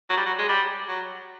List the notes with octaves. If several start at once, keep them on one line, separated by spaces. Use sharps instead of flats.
F#3
G3
F#3
G#3
G3
F#3